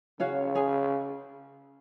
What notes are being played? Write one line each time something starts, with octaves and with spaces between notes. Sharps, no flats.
C#3 C#4 F#4 C#5 F5
G#4 C#5 G#5